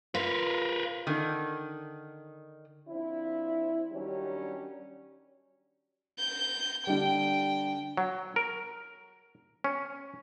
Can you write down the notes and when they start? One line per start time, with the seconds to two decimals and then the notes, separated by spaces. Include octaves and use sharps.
0.15 F4 A#4 B4
1.07 D3 D#3
2.89 F3 C4 D4 E4
3.92 D#3 F#3 G3 C#4 D4 G4
6.19 G6
6.87 D3 G3 G5
7.97 F#3
8.36 A#4
9.64 C#4